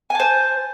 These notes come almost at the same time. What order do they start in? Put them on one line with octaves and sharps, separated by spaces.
G#5 A5 C5